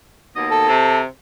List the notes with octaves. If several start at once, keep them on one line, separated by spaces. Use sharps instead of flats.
D#2 B2 D#5
A4
C3